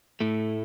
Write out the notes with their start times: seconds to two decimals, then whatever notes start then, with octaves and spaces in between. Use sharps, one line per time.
0.20 A2 A3